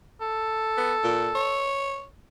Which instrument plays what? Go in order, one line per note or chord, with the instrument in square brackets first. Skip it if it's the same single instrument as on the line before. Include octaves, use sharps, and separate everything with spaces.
[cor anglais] A4
[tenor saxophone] B3
A#2
C#5